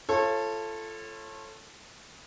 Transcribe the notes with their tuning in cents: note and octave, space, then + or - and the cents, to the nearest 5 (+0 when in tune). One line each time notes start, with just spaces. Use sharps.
F4 -30 A4 +0 C#5 -30